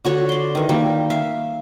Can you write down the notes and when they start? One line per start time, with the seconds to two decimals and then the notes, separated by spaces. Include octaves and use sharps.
0.05 D3 F#4 C#5
0.29 D5 C6
0.55 D#3 E3
0.69 D#3 G3 A#3
1.10 E5 F5